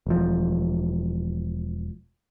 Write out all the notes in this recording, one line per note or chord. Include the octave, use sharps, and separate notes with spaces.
E1 F3